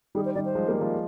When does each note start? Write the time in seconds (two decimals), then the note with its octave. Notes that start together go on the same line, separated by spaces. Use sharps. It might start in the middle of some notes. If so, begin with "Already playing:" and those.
0.15 D#3 G3 G#4
0.25 C5
0.34 D#3 G3 D5
0.45 C5
0.55 F3 G#3
0.68 G3 A#3
0.81 F3 G#3